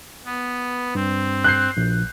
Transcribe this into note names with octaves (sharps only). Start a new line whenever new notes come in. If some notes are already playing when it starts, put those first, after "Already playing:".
B3
G2 C4
F#6 G6 C7
A#1